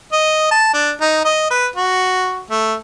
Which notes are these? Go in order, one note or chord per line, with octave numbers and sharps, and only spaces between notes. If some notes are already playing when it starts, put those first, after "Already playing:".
D#5
A5
D4
D#4
D#5
B4
F#4
A3